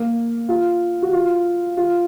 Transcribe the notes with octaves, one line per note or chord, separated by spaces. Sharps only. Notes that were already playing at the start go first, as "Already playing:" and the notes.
Already playing: A#3
F4
F#4
F4
F4